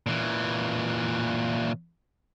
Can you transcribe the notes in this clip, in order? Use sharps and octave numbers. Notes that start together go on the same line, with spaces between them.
A#2 E3